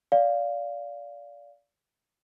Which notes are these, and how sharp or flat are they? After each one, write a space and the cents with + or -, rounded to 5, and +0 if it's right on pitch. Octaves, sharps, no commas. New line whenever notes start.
D5 -25 F5 +0